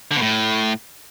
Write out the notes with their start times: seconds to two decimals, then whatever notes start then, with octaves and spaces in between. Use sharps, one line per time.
0.11 D3
0.16 B2
0.22 A2